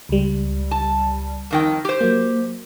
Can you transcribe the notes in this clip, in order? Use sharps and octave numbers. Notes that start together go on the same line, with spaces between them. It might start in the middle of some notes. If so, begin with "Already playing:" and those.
C#2 G3
A5
F2 D#3 G5
G4 C5
F#3 A#3